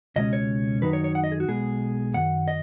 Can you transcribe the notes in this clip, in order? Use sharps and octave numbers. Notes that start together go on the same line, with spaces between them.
C#2 B2 G#3 C#4 D#5
C#5
F#2 D#3 F#3 D#4 B4
C#5
C#5
F#5
D#5
G#4
F#4
B1 B2 G#3 G#4
F#2 D#3 F#5
D#5